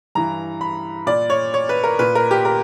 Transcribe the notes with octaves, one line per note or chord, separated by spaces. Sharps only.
G2 E3 A#5
B5
A#2 D5
C#5
C#5
B4
A#4
A#2 B4
A#4
G4
A#4